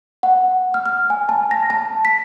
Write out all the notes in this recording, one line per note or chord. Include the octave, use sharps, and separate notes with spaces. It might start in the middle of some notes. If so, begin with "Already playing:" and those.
F#5
F6
F6
G#5
A5
A#6
A5
B6